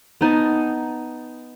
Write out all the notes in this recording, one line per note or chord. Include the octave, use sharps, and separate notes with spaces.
B3 D#4 G#5 A5